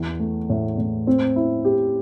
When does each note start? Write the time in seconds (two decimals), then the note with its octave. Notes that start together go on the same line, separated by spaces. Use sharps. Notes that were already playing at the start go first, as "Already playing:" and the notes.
Already playing: E2 E3
0.20 A3
0.50 A2
0.78 A2
1.07 C4
1.36 E4
1.65 G4